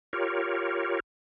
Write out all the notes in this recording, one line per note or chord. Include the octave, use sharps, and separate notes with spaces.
F4 G4 A#4 C#5